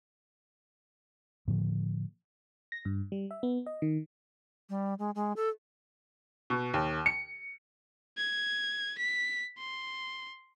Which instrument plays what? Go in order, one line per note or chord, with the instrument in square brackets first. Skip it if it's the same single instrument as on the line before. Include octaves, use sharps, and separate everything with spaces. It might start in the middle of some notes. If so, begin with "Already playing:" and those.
[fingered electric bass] A2 D3 F3 A#3
[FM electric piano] A#6
G2
G3
E5
B3
D#5
D#3
[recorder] G3
G#3
G#3
A4
[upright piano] B2
D#2
C#7
[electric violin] G#6
B6
C6